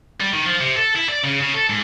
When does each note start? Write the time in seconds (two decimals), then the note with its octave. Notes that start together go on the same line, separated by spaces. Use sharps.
0.20 G3
0.33 D#3
0.46 F3
0.60 C3
0.76 A4
0.96 E4
1.10 D5
1.24 C#3
1.41 C#3
1.54 A4
1.70 G#2